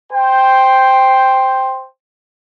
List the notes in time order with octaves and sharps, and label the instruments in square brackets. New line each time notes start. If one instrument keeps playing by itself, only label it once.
[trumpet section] C5 G5